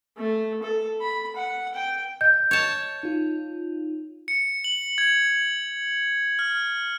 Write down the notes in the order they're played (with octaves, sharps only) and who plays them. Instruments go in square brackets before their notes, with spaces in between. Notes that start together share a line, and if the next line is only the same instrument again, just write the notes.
[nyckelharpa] A3
A4
B5
F#5
G5
[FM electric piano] D#5 [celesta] G6
[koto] C#5 A5
[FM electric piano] D#4 F4
[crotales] C#7
F#7
G#6
F6